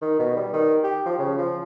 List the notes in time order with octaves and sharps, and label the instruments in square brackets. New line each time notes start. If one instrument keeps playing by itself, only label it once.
[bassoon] D#3
B2
G3
D#3
G4
F3
C#3
F3